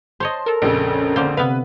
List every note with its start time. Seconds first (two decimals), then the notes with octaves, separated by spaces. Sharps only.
0.20 C5 C#5 D#5 A5 C6
0.46 A4 A#4
0.62 A#1 F2 C#3 E6
0.94 C#4
1.16 D3 A#3 C5
1.37 C3 B3 B4 E5 F5